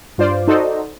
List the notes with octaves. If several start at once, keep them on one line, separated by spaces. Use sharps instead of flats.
G2 F4 C5 D5
D#4 F#4 A4 C5 D5 D#5